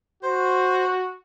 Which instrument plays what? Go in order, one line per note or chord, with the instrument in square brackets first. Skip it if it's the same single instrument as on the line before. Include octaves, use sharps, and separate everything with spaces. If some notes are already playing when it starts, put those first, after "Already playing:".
[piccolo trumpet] F#4 [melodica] C5